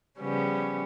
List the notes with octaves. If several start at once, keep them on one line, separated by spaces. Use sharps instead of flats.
C#3 F3 G3 B3 C#4